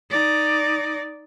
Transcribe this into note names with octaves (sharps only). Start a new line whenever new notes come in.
D#4 D5